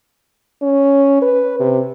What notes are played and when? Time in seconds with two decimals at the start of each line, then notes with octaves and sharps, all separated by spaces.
0.62 C#4
1.22 B4
1.60 C3